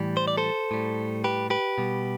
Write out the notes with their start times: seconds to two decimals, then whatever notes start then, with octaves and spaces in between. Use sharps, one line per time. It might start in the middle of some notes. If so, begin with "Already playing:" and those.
Already playing: A2 E3 G3
0.17 C5
0.28 D5
0.37 A4 C5
0.71 A2 G3
1.24 G4 B4
1.50 G4 B4
1.78 B2 G3